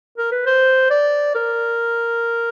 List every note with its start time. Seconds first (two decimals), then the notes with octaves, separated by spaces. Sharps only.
0.18 A#4
0.32 B4
0.46 C5
0.90 D5
1.35 A#4